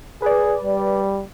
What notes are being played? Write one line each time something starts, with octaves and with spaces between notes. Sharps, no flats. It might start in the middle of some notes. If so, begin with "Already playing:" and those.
G#4 B4 D5
G3